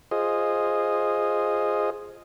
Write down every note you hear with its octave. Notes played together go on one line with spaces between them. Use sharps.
F4 G#4 C5 D#5